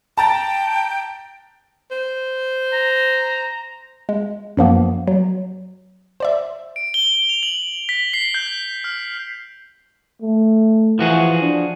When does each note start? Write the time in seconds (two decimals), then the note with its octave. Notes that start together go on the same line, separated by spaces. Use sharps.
0.18 G5 A5 A#5 A6
1.91 C5
2.73 A#5
4.09 G#3
4.57 F#2 F3 A#3 B3
5.08 F#3
6.20 C5 D5 E5
6.76 D7
6.94 G7
7.29 F7
7.43 F#7
7.89 B6
8.14 C7
8.34 G6
8.84 F6
10.22 A3
10.99 E3 F3 F#4 G#4
11.42 D4